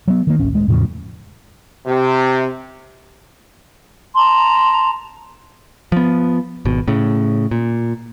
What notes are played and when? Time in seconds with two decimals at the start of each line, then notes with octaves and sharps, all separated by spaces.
0.08 F#3 B3
0.27 D#3 A#3
0.39 D1 A1 C#4
0.53 D1 G#3
0.68 E2 A2 C#3 F3
1.86 C3
4.15 A5 A#5 C6
5.92 F3 B3
6.65 G#1 B2
6.88 A2 C#3
7.51 A#2